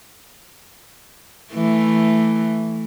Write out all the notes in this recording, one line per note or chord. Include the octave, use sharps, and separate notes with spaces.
E3 A3